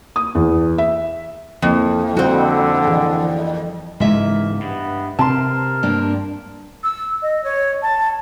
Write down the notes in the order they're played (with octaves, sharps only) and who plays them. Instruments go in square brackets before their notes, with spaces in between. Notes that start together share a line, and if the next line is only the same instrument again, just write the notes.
[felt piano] D#6
E2
E5
[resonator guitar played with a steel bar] F2 [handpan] F3 A#3 E4
[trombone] D3 [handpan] G3 [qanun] C4 F#4
[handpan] E3 G#4
[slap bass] G#2 C#3 E3 [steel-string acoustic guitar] G#3 E5 [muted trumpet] A#3
[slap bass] G2 [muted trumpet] B3
[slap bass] C3 C4 [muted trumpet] A#4 [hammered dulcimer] A5 C6
[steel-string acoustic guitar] G2 A#3 D4
[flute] E6
D#5
C#5
A5